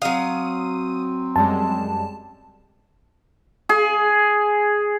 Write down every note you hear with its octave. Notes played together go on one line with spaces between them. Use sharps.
F#3 C4 F5 D#6 D#7
F#2 G3 G#3 A5
G#4